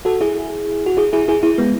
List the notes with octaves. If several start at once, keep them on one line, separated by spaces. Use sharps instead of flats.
F#4 A4
E4 G#4
F#4
E4 G#4
E4 G#4
E4 G#4
E4 G#4
G#3 B3